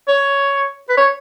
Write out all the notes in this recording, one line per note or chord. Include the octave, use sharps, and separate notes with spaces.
C#5
B4
C#5